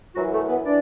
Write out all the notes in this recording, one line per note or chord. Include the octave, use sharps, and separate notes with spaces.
F#2 E3 F#3 F#4
A3 A4
B3 B4
E3 D4 D5